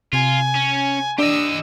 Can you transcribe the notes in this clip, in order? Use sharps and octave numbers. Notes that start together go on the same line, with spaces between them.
C3 F4 G#5
C#4
D4 G4 D#5 E6